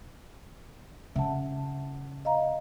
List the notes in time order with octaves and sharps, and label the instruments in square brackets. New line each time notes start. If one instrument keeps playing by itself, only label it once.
[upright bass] C#3 [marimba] E5 F#5 A5
[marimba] D#5 F5 A#5